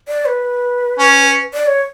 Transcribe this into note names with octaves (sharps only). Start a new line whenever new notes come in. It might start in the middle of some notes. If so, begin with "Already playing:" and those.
D5
B4
C#4
D5
C#5